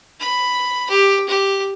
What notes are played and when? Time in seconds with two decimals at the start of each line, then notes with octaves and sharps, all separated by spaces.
0.20 B5
0.90 G4
1.29 G4